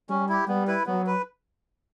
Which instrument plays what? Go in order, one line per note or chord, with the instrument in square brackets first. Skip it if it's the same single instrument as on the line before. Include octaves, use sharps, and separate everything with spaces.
[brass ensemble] G3 [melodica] C#4
[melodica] E4 G4
[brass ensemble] G3 [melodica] B3
[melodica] E4 B4
[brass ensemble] F#3 [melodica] B3
[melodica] B4